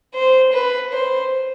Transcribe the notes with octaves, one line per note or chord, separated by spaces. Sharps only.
C5
B4
C5